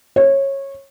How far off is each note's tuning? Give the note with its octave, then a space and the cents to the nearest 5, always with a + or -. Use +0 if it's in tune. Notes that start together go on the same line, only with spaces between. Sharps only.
C#5 -20